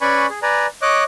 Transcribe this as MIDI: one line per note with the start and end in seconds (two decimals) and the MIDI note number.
0.01 0.27 61
0.01 0.27 71
0.01 0.27 74
0.01 0.27 80
0.01 0.27 83
0.01 0.27 85
0.30 0.39 68
0.42 0.67 71
0.42 0.67 74
0.42 0.67 80
0.42 0.67 82
0.82 1.04 73
0.82 1.04 75
0.82 1.04 86
0.82 1.04 90